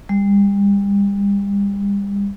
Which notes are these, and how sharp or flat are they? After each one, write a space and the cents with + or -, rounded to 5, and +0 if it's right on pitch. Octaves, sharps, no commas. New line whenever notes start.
G3 +35